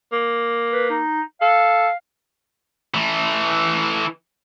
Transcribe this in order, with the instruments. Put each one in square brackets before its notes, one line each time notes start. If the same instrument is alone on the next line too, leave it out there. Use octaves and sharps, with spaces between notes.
[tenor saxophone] A#3
[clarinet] B4
D#4
[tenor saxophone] A4 [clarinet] F5
[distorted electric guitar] E3 A3